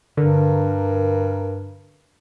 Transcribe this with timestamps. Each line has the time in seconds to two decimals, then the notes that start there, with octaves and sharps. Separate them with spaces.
0.17 G2 D3 A#4